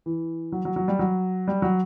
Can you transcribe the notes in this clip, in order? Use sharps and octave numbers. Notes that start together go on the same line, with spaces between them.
E3
F#3
F#3
F#3
G3
F#3
G3
F#3